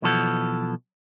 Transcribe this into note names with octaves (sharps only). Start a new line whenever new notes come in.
B1 B2 E3 F3 A4 F#5